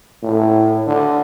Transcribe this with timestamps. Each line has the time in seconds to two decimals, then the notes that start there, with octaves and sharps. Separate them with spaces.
0.23 A2
0.87 D3